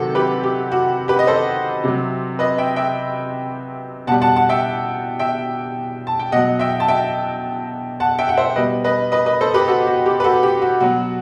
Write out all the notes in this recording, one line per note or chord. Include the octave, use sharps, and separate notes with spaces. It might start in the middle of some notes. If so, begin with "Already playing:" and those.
Already playing: C3 D#3 F#3 F#4 A4
G4 B4
G4
F#4
G4 B4
D#5
A4 C5
C3 F#3
B4 D#5
E5 G5
E5 G5
B2 G3 F#5 A5
F#5 A5
F#5 A5
E5 G5
E5 G5
A5
G5
B2 F#3 D#5 F#5
E5 G5
A5
E5 G5
F#5 A5
E5 G5
F#5
C5 E5
B2 G3 B4 D#5
B4 D#5
B4 D#5
B4 D#5
A4 C5
G4 B4
F#4 A4
F#4
G4
B4
F#4 A4
G4
F#4
B2 F#3 F#4